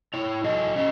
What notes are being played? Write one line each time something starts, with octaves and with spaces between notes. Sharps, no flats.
E4 C#5
F#3 D#5
C#4 D#5